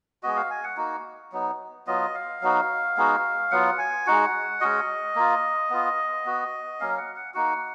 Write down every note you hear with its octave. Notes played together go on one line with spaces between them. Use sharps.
G#3 B3 F#4 D#5
F5
G#5
F#5
A#3 D#4 F#4
F#3 B3 D#4
F#3 B3 F4 D#5
F5
F#3 B3 D#4 F#4
G#3 B3 D#4 F#4
F#3 B3 F4 F#5
G#5
G#3 D#4 F#4 F#5
G#3 C#4 F#4 D#5
A#3 F4
B3 F4
B3 F#4
F#3 A#3 C#4 F5
F#5
F#5
A#3 D#4 F#4 F#5